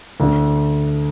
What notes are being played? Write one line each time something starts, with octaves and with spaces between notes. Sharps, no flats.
D2 D3